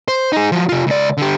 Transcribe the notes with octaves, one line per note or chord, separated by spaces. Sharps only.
C5
D#4 G#4
F3 F#3
C3 F4
C#2 D5
D3 G4